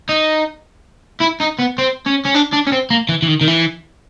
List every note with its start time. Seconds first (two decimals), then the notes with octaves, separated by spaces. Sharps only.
0.09 D#4
1.21 E4
1.41 D#4
1.59 B3
1.78 C4
2.06 C#4
2.25 C#4
2.34 D4
2.53 D4
2.67 C#4
2.72 C4
2.91 A#3
3.09 E3
3.22 E3
3.28 D#3
3.41 D#3
3.48 E3